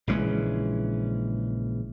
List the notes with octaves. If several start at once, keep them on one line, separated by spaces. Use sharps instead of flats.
A#1 C#3 E3 G#3